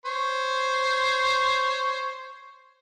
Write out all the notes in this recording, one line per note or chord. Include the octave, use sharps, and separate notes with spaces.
C5 C#5